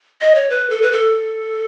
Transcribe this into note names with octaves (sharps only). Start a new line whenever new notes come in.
D#5
C#5
B4
A4
B4
A4